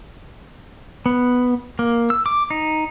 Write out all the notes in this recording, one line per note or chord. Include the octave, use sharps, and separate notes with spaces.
B3
A#3
E6
D6
D#4